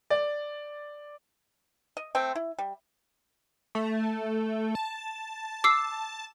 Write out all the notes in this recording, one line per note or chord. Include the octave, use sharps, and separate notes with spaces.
D5
D#5
A3 C4 G5
E4
G3
A3
A5
D6 E6 C7